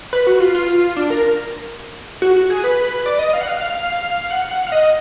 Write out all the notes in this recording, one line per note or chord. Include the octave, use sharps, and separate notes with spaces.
B4
F#4
F4
F4
D4
A#4
F#4
F#4
G#4
B4
D5
D#5
F5
F#5
F5
F5
F5
F#5
F#5
F5
D#5